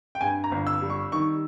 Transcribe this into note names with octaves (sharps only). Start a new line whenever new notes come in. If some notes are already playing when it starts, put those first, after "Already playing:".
G5
G2 G#5
A#5
G1
E6
G3
C#6
D#3 C#6